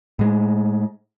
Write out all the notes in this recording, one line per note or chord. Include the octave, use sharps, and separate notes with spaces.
A2 G#3